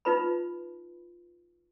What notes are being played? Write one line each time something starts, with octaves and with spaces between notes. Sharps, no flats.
D#4 F4 B4 B5